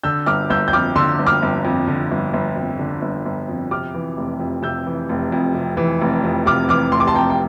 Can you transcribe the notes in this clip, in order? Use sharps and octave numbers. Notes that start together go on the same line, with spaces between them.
D3 E6 G6
G1 D6 F6
G1 E6 G6
G6
F2 D6 F6
D3 C6 E6
G1
D6 F6
G1
F2
D3
G1
G1
F2
D3
G1
G1
F2
C3 D6 F6
E3
F1
F2
C3 E6 G6
E3
F1
F2
C3
E3
F1
F2
C3 D6 F6
E3 D6 F6
F1 C6
D6
A5 C6
F2 G5 A#5
G5